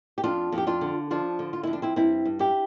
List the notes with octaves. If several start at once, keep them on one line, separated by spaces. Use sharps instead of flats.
G4
F2 D4 F4
F2
G4
D4 F4
D3
F3 D4 F4
D3
F4
F2 E4
D4
C4 E4
G2 C4 E4
G2
E4 G4